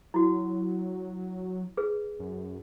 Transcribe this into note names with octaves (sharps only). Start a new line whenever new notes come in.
F#3 E4 F#4
G#4 B4
F#2